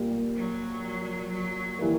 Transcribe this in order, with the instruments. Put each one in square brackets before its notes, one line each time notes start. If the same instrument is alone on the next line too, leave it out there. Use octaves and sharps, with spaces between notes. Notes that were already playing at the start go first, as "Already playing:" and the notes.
Already playing: [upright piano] A#2 G3 A#3
[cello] F#3
F#3
[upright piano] E3 G3 A#3